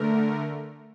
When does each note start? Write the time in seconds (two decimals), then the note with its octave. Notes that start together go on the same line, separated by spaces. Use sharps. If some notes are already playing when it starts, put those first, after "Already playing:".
Already playing: D3 A3 A#4